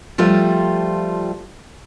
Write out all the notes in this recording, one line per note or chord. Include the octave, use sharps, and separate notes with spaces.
F3 G3 A3 F4